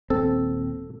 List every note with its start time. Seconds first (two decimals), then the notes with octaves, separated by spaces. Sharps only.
0.10 D#1 C4 A4